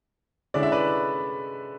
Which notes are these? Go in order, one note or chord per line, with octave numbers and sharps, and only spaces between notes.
D3 G#3 C#4 E4 D5
E5
B4 D5